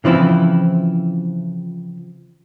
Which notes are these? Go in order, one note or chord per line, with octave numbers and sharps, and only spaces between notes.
C#3 E3 F3 C4 E4